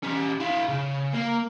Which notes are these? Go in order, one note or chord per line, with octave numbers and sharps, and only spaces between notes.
C#4 G4
E4 F5
C#3
A#3